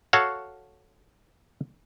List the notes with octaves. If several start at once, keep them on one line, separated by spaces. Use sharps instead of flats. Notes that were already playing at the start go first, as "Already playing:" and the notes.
F#4 A4 C#5 F5 F#5